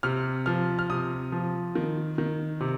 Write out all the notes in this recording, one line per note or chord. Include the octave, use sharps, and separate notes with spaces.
C3 F6
F3 F6
F6
C3 D#6
F3
D#3
D#3
C3